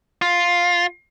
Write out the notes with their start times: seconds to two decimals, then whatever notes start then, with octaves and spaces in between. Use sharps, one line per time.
0.22 F4